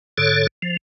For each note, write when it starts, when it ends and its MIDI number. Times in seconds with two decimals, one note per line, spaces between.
0.18 0.47 44
0.18 0.47 50
0.18 0.47 69
0.18 0.47 73
0.62 0.77 53